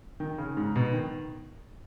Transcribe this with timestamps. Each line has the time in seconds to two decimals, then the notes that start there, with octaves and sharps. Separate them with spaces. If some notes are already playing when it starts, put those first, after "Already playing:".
0.20 D#3
0.38 C#3
0.57 G#2
0.76 B2
0.93 D#3